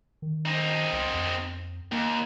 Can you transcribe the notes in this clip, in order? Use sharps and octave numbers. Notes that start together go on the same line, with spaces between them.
D#3
C4 D#4
C2
F2
D#2 A#3